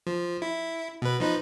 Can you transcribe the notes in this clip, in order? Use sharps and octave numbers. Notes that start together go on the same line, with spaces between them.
F3
E4
B2 B4
F3 D#4 B4